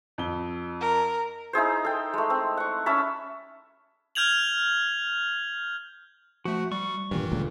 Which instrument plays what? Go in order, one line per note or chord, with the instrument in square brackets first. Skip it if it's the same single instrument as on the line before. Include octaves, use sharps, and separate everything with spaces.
[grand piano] F2 G7
[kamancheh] A#4
[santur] D#4 E4 G#4 C5
A4 G5
G#3 A3
C4
F#5 C#6
C#4 E5 A5 B5
[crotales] F6 G6 G#6 F7 F#7
[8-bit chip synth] F3 A3 [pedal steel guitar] F#4
[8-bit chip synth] G3 [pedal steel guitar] C#6
[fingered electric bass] G2 A#2 [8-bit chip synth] D#3 E3
[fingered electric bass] C#2 A#2 D3